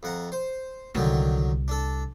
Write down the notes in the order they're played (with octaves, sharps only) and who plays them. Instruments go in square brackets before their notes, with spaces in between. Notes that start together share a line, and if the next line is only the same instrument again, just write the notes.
[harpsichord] F2 F#5 A#5
C5
[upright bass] C2 [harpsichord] D3 D#3 F#3
[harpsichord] D4 A4